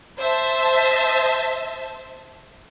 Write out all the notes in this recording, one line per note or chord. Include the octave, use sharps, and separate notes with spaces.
C5 E5 A5